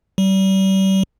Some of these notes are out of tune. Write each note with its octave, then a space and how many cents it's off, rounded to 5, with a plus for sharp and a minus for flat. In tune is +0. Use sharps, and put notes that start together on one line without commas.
G3 -35